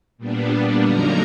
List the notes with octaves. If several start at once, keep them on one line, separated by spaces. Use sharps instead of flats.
A#2 G3 B3 D4
F2 D3 F#3 A#3 D#4 A#4 A#5